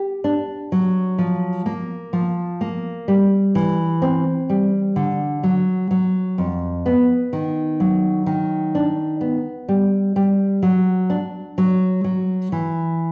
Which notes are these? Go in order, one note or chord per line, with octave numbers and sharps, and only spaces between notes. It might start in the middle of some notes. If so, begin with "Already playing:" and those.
Already playing: G4
D4
F#3
F3
A#3
F3
A#3
G3
E3
C4
G3
D3
F#3
F#3
F2
B3
D#3
F#3
D#3
D4
B3
G3
G3
F#3
D4
F#3
F#3
E3